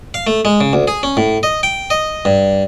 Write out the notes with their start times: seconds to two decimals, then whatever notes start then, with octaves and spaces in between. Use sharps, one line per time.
0.14 F5
0.27 A3
0.45 G#3
0.61 C#3
0.73 D2
0.88 G#4
1.03 C#4
1.17 A2
1.43 D#5
1.63 G5
1.90 D#5
2.25 G2